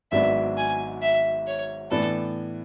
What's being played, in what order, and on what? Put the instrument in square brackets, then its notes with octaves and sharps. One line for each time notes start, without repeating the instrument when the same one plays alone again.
[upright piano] G#1 G#2 F#3 B3 D4 [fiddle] E5
[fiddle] G#5
E5
C#5
[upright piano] A2 E3 B3 D4 [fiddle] A4